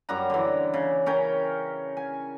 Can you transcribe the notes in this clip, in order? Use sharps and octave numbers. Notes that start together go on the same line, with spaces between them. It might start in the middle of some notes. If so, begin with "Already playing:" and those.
F#2 G3 F#5 A#5
D3 E3
C#3
C#4 A#4 G5
G#5